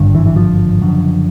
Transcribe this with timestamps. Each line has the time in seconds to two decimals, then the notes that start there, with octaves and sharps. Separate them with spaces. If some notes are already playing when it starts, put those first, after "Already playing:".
Already playing: G#1 G2 D3
0.15 E3
0.26 E3
0.36 F3
0.81 F#1 F#2 D3